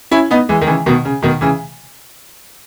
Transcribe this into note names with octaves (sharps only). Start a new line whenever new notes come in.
C#4 E4
B3 D#4
E3 G#3
D#3
C#3 E3
B2 D#3
C#3
B2 D#3
C#3 E3